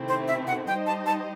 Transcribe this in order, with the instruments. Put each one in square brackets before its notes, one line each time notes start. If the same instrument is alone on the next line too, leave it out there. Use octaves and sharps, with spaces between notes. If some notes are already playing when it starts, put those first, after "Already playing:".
Already playing: [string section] C3 D#3 A3 C4 E4
[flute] C5
E5
F#5
[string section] G3 D#4 G4 C5 D#5 [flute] G5
[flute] A5
A5